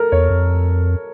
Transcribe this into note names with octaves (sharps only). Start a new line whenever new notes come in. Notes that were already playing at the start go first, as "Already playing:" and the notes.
Already playing: A4 A#4
E2 C#5
F2